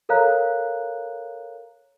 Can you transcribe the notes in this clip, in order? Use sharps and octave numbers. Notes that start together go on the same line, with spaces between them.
A4 A#4 C#5 F5 A#5 F#6